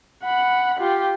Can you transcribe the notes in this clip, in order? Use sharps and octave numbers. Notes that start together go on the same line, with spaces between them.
F#5 B5
F4 G4